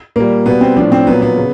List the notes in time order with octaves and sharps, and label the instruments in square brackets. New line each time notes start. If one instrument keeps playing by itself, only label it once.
[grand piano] A#2 G3 A#3
B2 G3 B3
C4
A2 F3 D4
C4
A#2 F#3 B3
B3
C#3